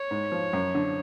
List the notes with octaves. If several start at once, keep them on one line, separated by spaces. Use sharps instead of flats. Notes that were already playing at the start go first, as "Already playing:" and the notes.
Already playing: C#5
G#2
F3
F#2
D3